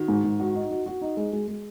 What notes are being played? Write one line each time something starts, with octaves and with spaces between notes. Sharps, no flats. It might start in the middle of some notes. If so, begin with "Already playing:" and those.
Already playing: D#3 F#4
G#2
G#2
F#4
D#4
F#4
F#4
D#4
G#3
G#3
G#3